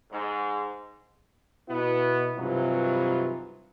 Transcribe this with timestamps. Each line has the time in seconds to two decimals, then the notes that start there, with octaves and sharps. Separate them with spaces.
0.12 G#2
1.69 B2 B3 E4
2.38 G2 C3 E3 F#3 D#4 F4